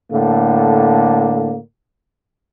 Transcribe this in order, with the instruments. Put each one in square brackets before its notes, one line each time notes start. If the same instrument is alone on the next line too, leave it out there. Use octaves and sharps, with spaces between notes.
[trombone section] A2 D3 A#3